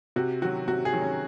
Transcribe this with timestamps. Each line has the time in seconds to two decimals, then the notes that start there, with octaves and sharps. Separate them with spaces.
0.16 C3 F#4
0.41 D#3 F#3 F#4
0.68 C3 F#4
0.85 G#4
0.93 D#3 F#3
1.02 C#4